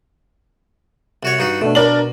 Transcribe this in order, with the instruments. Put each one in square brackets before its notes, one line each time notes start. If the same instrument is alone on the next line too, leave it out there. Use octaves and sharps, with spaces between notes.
[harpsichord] C2 F#4 C#5
G2 D#4 F#4
[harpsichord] B2 [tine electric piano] A3 D4
[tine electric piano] D4 [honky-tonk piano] A#4 D5 F#7